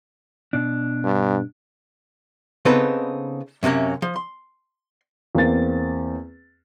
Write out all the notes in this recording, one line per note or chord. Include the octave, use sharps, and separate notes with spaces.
B2 D4
G2
C#3 B3 C4 D#4 A4 B4
F#2 C3 A3 A#3 C#4
F3
C6
E2 A#3 C4 A6